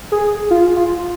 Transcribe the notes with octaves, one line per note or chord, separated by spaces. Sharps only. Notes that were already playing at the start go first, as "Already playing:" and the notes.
G#4
F4
F4